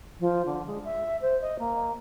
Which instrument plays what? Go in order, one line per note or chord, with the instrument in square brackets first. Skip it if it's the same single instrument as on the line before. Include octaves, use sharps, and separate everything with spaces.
[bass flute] F3
D3
G#3
E5
C5
D#5
A#3